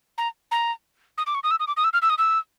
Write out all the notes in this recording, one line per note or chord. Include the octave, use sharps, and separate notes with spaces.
A#5
A#5
D#6
D6
C#6
D#6
E6
D#6
D6
D#6
E6
F6
E6
D#6
E6